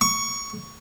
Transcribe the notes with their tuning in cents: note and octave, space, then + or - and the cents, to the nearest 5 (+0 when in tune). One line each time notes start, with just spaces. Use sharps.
C#6 +10